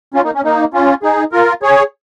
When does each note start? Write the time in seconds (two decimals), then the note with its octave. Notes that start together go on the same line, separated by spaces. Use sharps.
0.14 C#4 F4
0.24 A#3 D#4
0.34 C#4
0.44 A#3 D#4
0.74 C#4 F4
1.03 D#4 G#4
1.32 F4 A#4
1.62 G#4 C#5